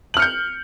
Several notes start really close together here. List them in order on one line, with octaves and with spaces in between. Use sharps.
F#7 F6 C#7 G6